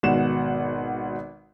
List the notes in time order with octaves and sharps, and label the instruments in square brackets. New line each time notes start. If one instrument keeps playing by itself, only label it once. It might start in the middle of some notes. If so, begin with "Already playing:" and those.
[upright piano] G#1 B2 F#5 E7